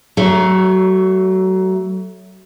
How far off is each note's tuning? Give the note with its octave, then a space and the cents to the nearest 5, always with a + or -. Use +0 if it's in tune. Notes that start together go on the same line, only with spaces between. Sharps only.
F#3 +25 A3 +0